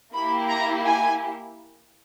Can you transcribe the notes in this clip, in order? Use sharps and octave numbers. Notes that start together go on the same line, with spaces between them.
A#3 E4 G4 B5
A#5
G#5